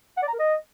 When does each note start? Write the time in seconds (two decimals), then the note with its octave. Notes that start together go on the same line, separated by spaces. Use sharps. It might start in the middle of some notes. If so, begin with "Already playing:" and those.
0.17 F#5
0.23 D5
0.28 A#5
0.34 A#4
0.39 D#5